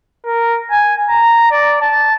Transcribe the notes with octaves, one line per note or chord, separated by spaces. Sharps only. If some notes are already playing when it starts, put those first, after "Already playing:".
A#4
G#5
A#5
D5
A5